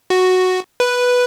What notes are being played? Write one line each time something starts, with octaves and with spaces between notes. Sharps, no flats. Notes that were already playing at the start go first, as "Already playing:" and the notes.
F#4
B4